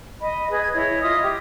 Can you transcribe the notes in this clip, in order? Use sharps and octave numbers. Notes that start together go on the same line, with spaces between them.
D#5 B5
G#4 B4 D#5
G#6
E4 C#5 D#5
F4 D#5 E5 D#6
G4